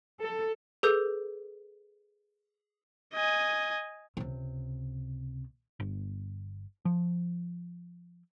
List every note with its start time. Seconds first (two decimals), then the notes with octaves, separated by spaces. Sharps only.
0.21 A4
0.83 G#4 A4 B4 E6 G6
3.14 D#5 G#5
4.17 C#2 C3
5.80 G1
6.85 F3